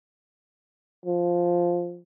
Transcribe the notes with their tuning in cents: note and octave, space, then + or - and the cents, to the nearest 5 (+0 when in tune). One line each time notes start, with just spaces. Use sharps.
F3 +0